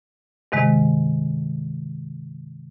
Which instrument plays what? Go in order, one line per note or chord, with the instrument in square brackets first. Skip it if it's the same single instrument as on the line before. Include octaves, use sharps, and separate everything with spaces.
[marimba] G2 C3 D#3 G#3